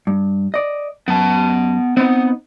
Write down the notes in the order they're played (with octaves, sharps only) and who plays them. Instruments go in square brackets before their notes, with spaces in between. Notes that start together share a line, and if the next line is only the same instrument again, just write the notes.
[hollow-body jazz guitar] G2
D5 D#5
[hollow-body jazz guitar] F#2 [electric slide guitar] B3 A5
[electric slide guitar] B3 [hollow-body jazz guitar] C4 D#4